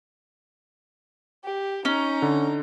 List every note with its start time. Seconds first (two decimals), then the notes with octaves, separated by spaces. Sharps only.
1.44 G4
1.85 C#4 D#4 A#5
2.22 D3